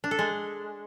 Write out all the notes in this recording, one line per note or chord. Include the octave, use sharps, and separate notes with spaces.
D4
A4
G#3